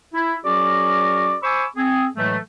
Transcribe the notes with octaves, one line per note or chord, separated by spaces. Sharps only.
E4
F#3 C#4 F#4 G#4 A#4 D5
C5 G#5 B5 C#6 D6 E6
C4 G#4
A2 E3 F#3 G#3 A3